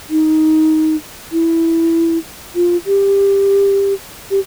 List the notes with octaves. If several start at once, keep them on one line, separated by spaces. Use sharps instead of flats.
D#4
E4
F4
G4
G4